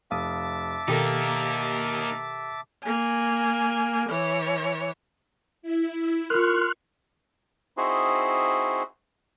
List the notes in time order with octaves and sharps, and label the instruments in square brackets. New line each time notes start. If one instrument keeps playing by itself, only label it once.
[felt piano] F1 [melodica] E5 A5 D6 [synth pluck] F5 D#6
[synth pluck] B2 D#3 [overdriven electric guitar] A#3 D#4 [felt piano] G4 A4 A#4
[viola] A#3 G#5
E3 C#5
[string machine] E4
[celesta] F4 A#4 [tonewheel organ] C6 F6 F#6 [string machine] C#6
[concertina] C4 D#4 E4 F#4 G#4 C5